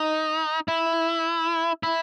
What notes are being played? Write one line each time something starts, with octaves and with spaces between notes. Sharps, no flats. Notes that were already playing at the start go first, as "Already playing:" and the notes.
Already playing: D#4
E4
E4